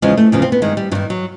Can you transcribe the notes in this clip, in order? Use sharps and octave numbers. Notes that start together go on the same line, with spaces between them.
E2 C#3 F3 G#3
A3
E2 C#3 F3
C4
B3
G2 D#3 G#3
G3
G2 D#3 F#3
F#3